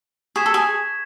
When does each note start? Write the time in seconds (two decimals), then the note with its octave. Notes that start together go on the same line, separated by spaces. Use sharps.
0.36 G#4 C#6 G#6 B6 E7
0.46 A4
0.54 G#4